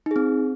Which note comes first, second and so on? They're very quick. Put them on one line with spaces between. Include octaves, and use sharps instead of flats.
D#4 G#4 C4